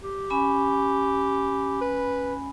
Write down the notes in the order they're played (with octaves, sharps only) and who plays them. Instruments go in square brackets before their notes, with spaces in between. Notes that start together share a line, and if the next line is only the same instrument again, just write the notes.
[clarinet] G4
[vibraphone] C#4 G#5 B5
[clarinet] B4